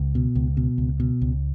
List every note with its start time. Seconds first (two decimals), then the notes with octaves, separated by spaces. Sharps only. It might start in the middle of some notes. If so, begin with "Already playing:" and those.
Already playing: C#2
0.15 B2
0.36 C#2
0.57 B2
0.78 C#2
1.00 B2
1.22 C#2